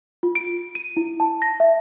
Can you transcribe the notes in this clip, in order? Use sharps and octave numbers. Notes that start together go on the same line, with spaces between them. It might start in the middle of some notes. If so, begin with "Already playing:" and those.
F4
D7
D#7
E4
A5
A#6
E5